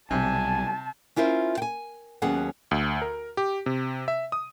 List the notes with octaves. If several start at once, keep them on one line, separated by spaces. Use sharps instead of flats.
B1 C3 G3 G#5 A5
C#4 E4 F4 A#4 C5
G5 G#5
D#2 F#3 B3 C#4 G#4 F#5
D2
A#4
G4
C3
E5
D#6